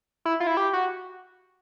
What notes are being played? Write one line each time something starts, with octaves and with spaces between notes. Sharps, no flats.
E4
F4
E4
G4
F#4